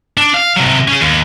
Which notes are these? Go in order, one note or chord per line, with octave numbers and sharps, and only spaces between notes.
D4
F5
C3 F#3
C#4 G#4
D#2